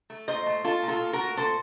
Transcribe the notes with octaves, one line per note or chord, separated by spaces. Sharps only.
A3
A#2 C5 D#5
A3
A3 F4 A4
A#2
F4 A4
A#2
F#4 A#4
A3
A#2 A4 C5